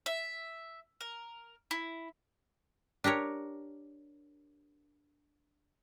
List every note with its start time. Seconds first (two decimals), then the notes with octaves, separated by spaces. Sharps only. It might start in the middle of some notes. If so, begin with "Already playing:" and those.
0.06 E5
1.01 A#4
1.71 E4
3.04 D4 G4 A#4 C#5